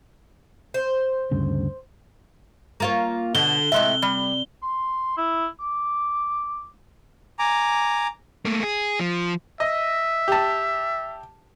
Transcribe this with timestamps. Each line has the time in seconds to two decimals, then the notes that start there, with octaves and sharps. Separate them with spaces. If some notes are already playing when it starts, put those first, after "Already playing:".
0.74 C5
1.31 D2 G2 C#3
2.80 A#3 F4 C#5
3.35 B2 D3 G7
3.72 A2 C3 G#3 E5
4.02 G3
4.62 C6
5.17 E4
5.60 D6
7.39 G#5 A#5 D6
8.45 A3 A#3
8.63 G#4
9.00 F3
9.60 D#5 E5
10.28 G4 A5